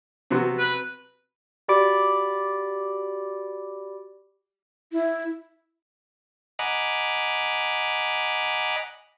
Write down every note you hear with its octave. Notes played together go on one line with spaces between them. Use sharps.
C3 F#3 B3
B4
F#4 G4 D5 B5 D6 D7
E4
D#5 F#5 G#5 A#5 B5 D6